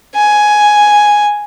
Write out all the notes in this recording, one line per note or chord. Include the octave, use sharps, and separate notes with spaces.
G#5